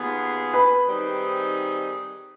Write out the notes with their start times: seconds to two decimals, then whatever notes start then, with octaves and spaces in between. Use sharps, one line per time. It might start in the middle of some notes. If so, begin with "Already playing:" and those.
Already playing: D#2 D#3 B3 F4 G#4
0.54 B4 B5
0.87 D#3 G3 C4 D#4 G#4